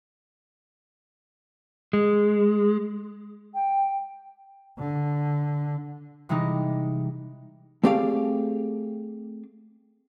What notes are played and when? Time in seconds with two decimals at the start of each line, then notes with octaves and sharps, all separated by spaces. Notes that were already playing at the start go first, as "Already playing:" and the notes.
1.93 G#3
3.54 G5
4.78 D3
6.29 C3 E3 G3 G#3 D#4
7.84 A3 C4 G4 G#4 D5 F5